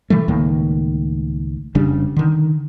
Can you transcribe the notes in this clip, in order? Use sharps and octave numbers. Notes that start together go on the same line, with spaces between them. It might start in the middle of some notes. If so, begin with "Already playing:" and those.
C3 E3 G3 A3
C#2 A2 D#3 A#3
F1 C#3 G3 D4
D3 D#3